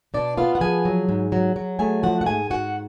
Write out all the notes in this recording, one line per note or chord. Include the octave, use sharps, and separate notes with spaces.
B2 D4 D5
B3 F4 F5
F#5
F3 G#4 G#5
F#3
G#2
F#3
F#3
A3 G#4 G#5
F3 F#4 F#5
F#5
G#2 G#4 G#5
G#2 F#4 F#5